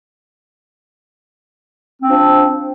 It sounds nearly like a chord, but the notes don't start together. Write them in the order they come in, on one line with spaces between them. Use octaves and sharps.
C4 D4 F3